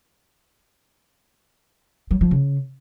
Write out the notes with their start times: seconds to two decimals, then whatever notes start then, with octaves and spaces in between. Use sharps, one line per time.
2.11 F#3
2.21 F3
2.31 C#3